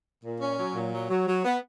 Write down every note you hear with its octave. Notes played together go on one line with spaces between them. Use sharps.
A#2
C#4
F#3
A#2
F#3
F#3
F#3
B3